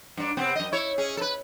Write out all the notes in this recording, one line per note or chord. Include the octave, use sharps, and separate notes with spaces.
G2 D4
C3 B3 C4
F#2 D#5
E4 C#5
C#4 G#4
A4 B4